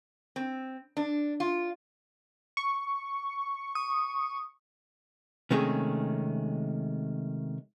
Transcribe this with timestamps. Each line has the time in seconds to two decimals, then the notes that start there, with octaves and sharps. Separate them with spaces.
0.36 C4
0.97 D4
1.40 F4
2.57 C#6
3.75 D#6
5.51 C3 D#3 G#3 A3 C#4 G#4